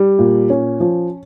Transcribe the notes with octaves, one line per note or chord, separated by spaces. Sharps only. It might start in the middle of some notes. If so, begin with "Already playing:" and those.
Already playing: G3
A#2
C#4
F3